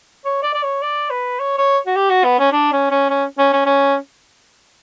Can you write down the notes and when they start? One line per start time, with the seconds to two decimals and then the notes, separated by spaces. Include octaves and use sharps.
0.25 C#5
0.43 D5
0.54 D5
0.63 C#5
0.82 D5
1.10 B4
1.39 C#5
1.58 C#5
1.86 F#4
1.95 G4
2.10 F#4
2.24 B3
2.39 C#4
2.52 D4
2.72 C#4
2.90 C#4
3.10 C#4
3.38 C#4
3.53 C#4
3.66 C#4